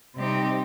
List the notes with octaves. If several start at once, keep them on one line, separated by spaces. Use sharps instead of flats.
C3 G3 C4 D#4 G4